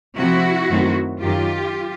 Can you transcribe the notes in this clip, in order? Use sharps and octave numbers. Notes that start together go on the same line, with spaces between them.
C3 F3 A3 C4 E4 F#4
F#2 D#3 F#3 A3 C4
F#2 D#3 F#3 F4 G4